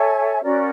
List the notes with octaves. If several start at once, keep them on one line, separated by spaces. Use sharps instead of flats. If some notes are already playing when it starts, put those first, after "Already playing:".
Already playing: A4 C#5 E5 G#5
C#4 F#4 A#4 D5